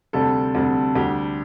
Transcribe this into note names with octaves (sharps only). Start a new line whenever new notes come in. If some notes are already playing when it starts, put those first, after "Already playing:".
D2 C3 G3 A4
D2 C3 G3
D2 D3 G3 G4